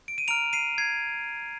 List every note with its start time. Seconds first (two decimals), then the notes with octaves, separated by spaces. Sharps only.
0.08 D7
0.18 D#7
0.28 A#5 F6 D7 F7
0.53 C7 D#7
0.78 G#6 C7